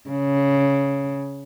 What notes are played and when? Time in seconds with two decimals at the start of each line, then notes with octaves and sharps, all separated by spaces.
0.10 C#3